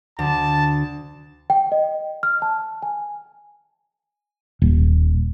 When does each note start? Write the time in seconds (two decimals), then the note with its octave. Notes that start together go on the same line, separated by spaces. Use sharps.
0.19 D2 A5
1.50 G5
1.72 D#5
2.23 F6
2.42 A5
2.82 G#5
4.62 D#1